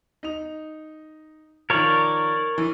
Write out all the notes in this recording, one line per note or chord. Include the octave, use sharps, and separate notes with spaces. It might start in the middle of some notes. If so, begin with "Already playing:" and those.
D#4 F7
D#3 F3 A#4 C#5 D5
E3